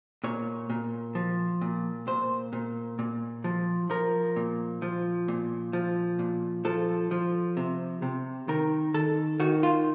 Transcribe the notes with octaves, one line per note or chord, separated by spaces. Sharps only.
A#2 C#5
A#2
F3
A#2
A#2 C5
A#2
A#2
F3
F3 A#4
A#2
F3
A#2
F3
A#2
F3 A4
F3
C3
C3
D#3 A#4
D#3 A4
D#3 F#4
F4